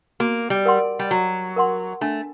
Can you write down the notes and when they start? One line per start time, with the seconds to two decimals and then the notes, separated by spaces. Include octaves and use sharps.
0.20 A#3 F#4
0.50 G3
0.65 A#4 F#5 C6
0.99 G3
1.11 F#3 F#4
1.56 A#4 F#5 C6
2.01 A3 D4